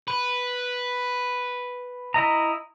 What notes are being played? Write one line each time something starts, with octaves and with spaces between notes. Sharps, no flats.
B4
E4 D#5 A#5